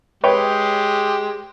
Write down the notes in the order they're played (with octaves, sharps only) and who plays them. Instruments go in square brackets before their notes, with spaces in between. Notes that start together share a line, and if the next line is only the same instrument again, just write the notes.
[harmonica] G#3 G4 [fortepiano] B4 C#5 G5